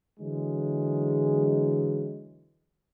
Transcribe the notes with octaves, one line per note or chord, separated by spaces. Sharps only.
D3 E3 F#3 G#3